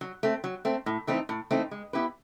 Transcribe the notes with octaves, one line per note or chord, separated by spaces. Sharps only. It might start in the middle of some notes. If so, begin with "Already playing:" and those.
F#3
A3 C4
F#3
A3 C4
A2
E3 A3 C4 D#4
A2
E3 A3 C4 D#4
G#3
B3 E4 G4 B4